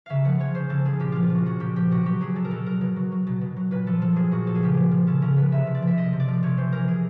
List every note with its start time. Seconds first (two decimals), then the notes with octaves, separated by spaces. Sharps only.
0.06 C#3 E5 F5
0.25 F3 F#5
0.39 F3 C#5
0.54 C#3 C5
0.69 C#3 A4
0.85 F3 G#4
1.00 A#2 G4
1.12 F3 F4
1.23 F4
1.30 F3 F#4
1.46 A#2 F#4
1.60 A#2 G4
1.76 F3 G4
1.91 B2 F#4
2.06 F#3 G4
2.21 F#3 G#4
2.36 B2 A4
2.45 A#4
2.51 B2 A4
2.66 F#3 A#4
2.81 B2
2.96 F#3
3.12 F#3
3.27 B2
3.41 B2
3.56 F#3
3.71 A#2 B4
3.86 F3 A4
4.02 F3 A4
4.16 A#2 G#4
4.31 A#2 F#4
4.46 F3 A4
4.55 G#4
4.62 C#3 G4
4.73 F3 G#4
4.91 F3
5.07 C#3 A4
5.22 C#3 A#4
5.37 F3 B4
5.52 C3 E5
5.67 F3
5.75 D5
5.82 F3 E5
5.97 C3 D#5
6.13 C3
6.20 D5
6.28 F3
6.43 C3 C#5
6.57 E3 C5
6.72 E3 A#4
6.88 C3 G#4